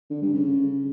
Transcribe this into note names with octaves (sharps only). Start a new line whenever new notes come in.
D3
G2
C#3